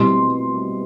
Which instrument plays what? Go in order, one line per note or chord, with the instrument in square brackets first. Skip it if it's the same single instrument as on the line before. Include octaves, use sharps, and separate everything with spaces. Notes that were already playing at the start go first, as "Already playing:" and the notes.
Already playing: [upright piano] B2 G3 C4 E4 C6